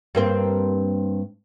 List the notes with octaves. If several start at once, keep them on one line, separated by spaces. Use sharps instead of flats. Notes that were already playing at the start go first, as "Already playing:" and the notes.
G2 A#3 C4